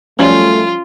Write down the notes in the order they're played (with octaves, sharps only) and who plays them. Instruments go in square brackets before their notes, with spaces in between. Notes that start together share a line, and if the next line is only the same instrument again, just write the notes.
[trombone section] F#2 A3 [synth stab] F3 G3 [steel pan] C#4 [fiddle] F4